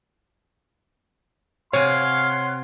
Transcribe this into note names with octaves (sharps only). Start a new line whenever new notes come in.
C3 C#5 F5 F#5 G#5 C6